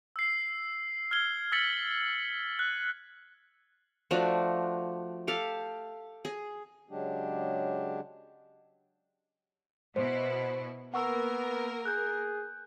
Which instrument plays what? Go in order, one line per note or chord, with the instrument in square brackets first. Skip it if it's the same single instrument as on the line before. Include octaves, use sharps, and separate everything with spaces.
[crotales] E6 C7
F6 G#6 G7
E6 F6 A6 B6 C#7 F#7
F#6
[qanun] F3 A3 D4 F#4
G4 A4 F5
G#4
[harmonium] C#3 F#3 G#3 D4 G4
[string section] B2 E4 [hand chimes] C5
[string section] A#3 A#4 [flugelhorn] B3 [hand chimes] F#5 C#6 E6
[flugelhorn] G#4 [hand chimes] F#6 G6